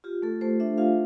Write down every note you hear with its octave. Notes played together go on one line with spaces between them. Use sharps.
F4 G4
A3 A4
A3 C5
D4 E5
F4 F5